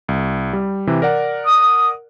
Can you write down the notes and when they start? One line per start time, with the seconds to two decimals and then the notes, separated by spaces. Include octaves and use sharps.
0.09 C2
0.53 G3
0.87 C3 E3
1.02 A#4 D5 F#5
1.46 D#6